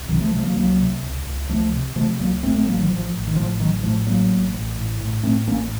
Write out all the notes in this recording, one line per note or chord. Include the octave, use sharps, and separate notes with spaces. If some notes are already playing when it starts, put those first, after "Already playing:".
Already playing: C2
C3 D#3 F#3
F3 A3
C3 F3 A3
F#3 A#3
C#2 F#3 A#3
C3
C#2
C#2
C#2 F3 A3
C3
C3 F3 A3
C#2 F#3 A#3
A1 A3 C4
A3 C4
A1 F#3 A#3
D#3 F#3
A1 F3
A1
D#3
A2 F3
A1 D#3 F#3
A2 F3 A3
A1 F#3 A#3
A1
A1
A2
A2
A2 A3 C4
A1 A#3 C#4